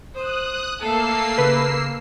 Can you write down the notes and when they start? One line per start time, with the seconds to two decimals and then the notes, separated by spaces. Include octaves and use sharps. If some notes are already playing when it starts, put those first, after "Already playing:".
0.15 C5 D#6 F#6
0.80 A3 A#3 A4 E6 C7
1.38 C#3 B4